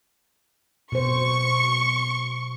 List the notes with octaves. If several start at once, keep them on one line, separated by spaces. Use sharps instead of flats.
B2 C5 C#6